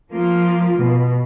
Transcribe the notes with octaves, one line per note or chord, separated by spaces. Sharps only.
F3 A#3 F4
B2